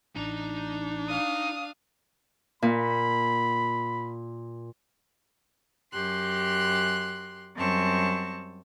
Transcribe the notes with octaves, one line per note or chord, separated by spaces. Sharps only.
A1 D4 D#4 A#5
F5 D#6
A#2 B5
F#2 G4 C6 F#6
F#2 G3 C4 A5 C#6